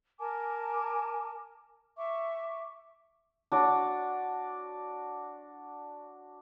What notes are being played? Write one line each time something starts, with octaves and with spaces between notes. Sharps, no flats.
A#4 G#5 A5 D6
E5 C#6 D6
D4 F#4 D5